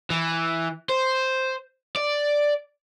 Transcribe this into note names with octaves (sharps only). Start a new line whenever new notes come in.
E3
C5
D5